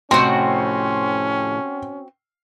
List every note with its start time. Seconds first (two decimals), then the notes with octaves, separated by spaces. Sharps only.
0.11 F2 A2 C3 C4 C#4 F#4 C6